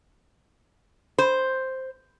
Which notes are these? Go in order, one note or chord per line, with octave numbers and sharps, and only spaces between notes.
C5